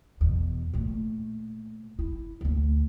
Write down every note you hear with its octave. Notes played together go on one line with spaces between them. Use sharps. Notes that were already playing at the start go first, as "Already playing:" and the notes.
E2 B2
A#2 A3
E4
D2 A3